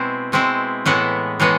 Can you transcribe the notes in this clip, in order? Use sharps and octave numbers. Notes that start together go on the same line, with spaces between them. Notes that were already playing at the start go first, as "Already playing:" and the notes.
Already playing: B2 G#3 C4 E4
B2 G#3 C4 E4
A2 E3 G#3 B3 E4
A2 E3 G#3 B3